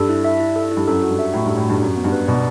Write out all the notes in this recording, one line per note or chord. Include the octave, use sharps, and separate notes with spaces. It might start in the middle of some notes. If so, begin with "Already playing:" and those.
Already playing: G2 A4
E4
E5
E4
A4
E4
G2
F#2 A4
F#4
G2
E5
A2 F#4
G2 A4
A2
G2 F#4
G2
F#2 F#4
B3
G2
B4
B2 D5